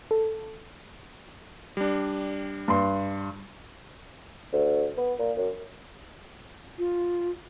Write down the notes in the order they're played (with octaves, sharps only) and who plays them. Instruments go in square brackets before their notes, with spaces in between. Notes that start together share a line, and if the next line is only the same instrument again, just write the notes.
[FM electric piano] A4
[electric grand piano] G3 D4
[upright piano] G2 C6
[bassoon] D2
B3
A#2
F#2
[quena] F4